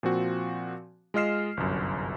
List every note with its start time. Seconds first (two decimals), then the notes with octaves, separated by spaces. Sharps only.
0.03 A#2 F3 C4 F#4
1.14 G#3 F4 D#5 F6 C7 E7
1.57 G1 C2 F#2